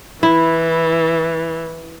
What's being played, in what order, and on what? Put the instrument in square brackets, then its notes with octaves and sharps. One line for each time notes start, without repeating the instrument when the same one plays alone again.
[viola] E3 [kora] E4